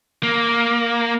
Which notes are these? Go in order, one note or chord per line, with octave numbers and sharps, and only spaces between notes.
A#3